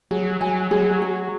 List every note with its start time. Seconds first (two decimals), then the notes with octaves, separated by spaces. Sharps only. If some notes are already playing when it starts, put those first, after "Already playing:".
0.11 F#3 G#4
0.41 F#3 G#5
0.71 F#3 G#4
1.02 G#4